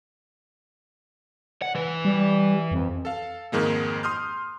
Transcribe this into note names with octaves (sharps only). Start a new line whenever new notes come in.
F#5
E3 B4
G3
F2
A4 F5
F2 G#2 D#3 G#3 A#3
C6 D#6 F6 G6